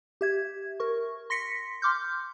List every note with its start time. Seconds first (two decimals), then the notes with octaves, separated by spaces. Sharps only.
0.21 G4 E5 G#6
0.80 A#4 C#6
1.30 C6 A#6 B6 C#7
1.82 C6 D6 F6 G6